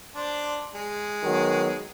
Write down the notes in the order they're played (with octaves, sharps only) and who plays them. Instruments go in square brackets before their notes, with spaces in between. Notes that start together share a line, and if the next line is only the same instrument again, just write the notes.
[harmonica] D4 C5 D5
G#3
[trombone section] D#3 F#3 B3